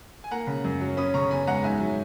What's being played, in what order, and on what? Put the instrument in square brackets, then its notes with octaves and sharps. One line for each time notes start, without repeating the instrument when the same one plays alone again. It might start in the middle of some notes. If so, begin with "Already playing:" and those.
[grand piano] G#5
A#3 F#5 A#5
C#3
F#2
F#3
C#4 B5 D#6
C#3 A#5 C#6
E2 G#5 B5
G#3 F#5 A#5
G#2 E5 G#5
F#3